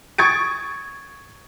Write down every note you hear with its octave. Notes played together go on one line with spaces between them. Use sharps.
C#6 D#6 G#6 A6 C#7 D7